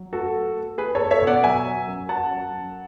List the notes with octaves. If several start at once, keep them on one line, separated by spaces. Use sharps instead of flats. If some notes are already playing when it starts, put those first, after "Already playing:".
Already playing: F#3
A3 F#4 A4
A3
A3
A3 G#4 B4
A3 A4 C#5
C#5 E5
B2
D5 F#5
F#3 E5 G#5
F#3
F#2
F#3 F#5 A5
F#3
F#2